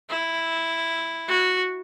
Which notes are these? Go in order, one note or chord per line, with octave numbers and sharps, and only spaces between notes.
E4
F#4